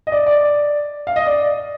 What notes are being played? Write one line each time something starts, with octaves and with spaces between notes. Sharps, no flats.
D#5
D5
D5
F5
D#5
D5